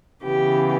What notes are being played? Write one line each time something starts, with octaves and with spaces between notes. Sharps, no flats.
C#3 E3 B3 G4